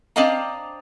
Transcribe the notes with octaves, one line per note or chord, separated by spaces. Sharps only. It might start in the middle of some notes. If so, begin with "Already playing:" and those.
C4 D4 D#5 F5 A#5